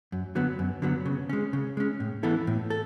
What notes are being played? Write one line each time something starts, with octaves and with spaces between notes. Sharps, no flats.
F#2
D3 F#3 B3
F#2
D3 F#3 B3
C#3
G#3 C#4
C#3
G#3 C#4
A2
E3 B3 E4 A4
A2
A4